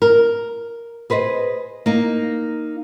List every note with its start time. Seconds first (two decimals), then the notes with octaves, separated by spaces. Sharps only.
0.02 A#4
1.10 G#4 B4 C5 D#5
1.86 A#3 D#4